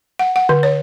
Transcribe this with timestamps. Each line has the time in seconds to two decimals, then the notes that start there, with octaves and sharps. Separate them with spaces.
0.19 F#5
0.36 F#5
0.49 D3
0.63 C#5